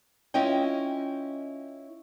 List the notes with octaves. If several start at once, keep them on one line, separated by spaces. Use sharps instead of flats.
C#4 E4 F4 D#5 G5